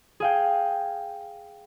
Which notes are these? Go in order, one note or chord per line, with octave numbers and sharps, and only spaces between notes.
G#4 F5 G5